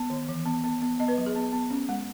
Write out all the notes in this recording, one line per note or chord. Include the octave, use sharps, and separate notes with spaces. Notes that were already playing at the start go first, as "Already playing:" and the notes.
Already playing: B3
D#3
E3
B3
B3
B3
B3 D#5
B4
F#3
G#4
B3
B3
C#4
G#3